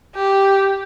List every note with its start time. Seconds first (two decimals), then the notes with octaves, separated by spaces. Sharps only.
0.15 G4